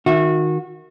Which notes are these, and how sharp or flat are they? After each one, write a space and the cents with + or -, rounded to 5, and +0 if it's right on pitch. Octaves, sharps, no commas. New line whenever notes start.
D#3 +0 F#4 -25 E5 +0